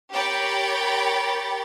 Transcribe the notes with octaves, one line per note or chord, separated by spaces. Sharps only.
G4 A#4 C#5 G5 B5 A6